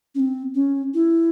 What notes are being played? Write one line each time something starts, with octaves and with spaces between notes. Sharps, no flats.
C#4
C4
C#4
E4